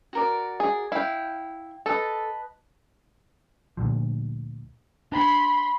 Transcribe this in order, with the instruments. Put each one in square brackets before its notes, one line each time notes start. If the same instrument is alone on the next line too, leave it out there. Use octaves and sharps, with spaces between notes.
[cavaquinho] F#4 A#4 D5
[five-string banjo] G#4
[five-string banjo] E4 [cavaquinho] F5 G5
[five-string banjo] A4 [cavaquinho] B4 D#5 A5
[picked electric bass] D2 A#2 F3
[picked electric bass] D4 [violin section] B5 C6